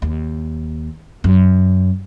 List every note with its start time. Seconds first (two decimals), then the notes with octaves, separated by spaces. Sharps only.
0.02 D#2
1.24 F#2